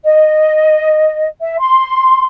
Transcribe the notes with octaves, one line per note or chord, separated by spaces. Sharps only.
D#5
E5
C6